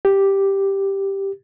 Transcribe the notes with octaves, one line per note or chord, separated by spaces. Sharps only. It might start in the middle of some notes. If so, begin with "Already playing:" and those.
G4